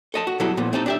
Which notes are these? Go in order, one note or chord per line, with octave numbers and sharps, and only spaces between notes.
A4 D#5 A5
F#4
B2 F#3 G3 E4 A4
A#2 F3 B3
A3 C4 D#4 G4 A4
D4 G4 E5